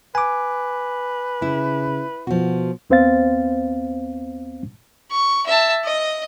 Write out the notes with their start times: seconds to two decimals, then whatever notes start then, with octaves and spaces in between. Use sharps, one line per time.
0.15 B4 G#5 D6
1.42 C#3 E4
2.27 B2 F3 F#4
2.90 D#2 B3 C4 C5 F5 A6
5.11 C#6
5.46 E5 A5
5.84 D#5